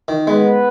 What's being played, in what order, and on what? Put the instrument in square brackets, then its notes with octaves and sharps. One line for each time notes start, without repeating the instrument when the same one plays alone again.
[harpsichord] D#3
[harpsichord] G#3 [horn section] B3 B4